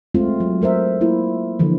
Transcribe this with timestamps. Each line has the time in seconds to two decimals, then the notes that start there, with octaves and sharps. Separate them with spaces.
0.14 G#3 A3 C4 F4
0.40 F#3
0.62 A3 A#4 C5 E5
1.01 A#3 E4 F4
1.59 D3 E3 F3